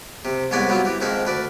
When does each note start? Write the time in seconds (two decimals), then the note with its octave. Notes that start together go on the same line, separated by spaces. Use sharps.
0.25 C3
0.51 C2 G#2 B3 C#5 D5 G#5
0.69 F#3 G3 B3 C4 F4
0.85 E3 G4
1.01 F2 G#2 D#3 G#3 E5 F5
1.25 D2 B4 D5